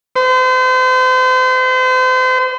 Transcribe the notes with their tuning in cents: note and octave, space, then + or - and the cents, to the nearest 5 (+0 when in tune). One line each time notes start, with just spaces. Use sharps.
C5 -40